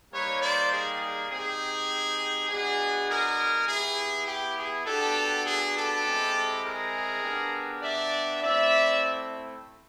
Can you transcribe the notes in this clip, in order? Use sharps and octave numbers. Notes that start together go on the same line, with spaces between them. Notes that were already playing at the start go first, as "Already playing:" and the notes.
G3 A#3 D#4 G4 B4 C#5
C5 D5
G#4
G#4
C4 D#4 G4 G#4
G#3 B3 D4 F#4 G#4
G#4 A#4
B3 E4 G4 G#4
G4
G#4
B3 D4 F#4 G4 A4
G#4
G4 A4
G#3 C4 E4
G#4 A#4
B3 D4 G4
D5 E5
A3 C4 E4 D5 E5